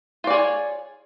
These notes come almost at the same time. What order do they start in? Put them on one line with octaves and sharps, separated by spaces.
F4 D5 G#4 C#5